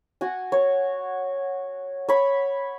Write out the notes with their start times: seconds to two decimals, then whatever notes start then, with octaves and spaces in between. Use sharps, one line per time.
0.21 F#4 F#5 G#5
0.52 C#5
2.08 C#5 B5